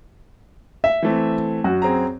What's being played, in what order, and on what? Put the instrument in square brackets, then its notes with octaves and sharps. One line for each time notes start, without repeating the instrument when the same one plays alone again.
[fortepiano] E5
[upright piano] E3 A3 C4
[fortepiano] F#2 [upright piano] F#4
[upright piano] C4 G#4 A#5